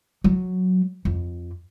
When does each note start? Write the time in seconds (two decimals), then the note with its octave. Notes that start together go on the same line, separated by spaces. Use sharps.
0.24 F#3
1.05 F2